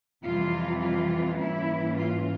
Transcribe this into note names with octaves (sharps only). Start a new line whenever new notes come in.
F2 C3 E3 G3 F4
F4
G#2 E3 G3 A#3 C#4 E4
F4